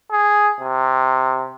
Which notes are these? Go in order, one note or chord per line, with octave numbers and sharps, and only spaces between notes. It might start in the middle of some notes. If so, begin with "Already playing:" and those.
G#4
C3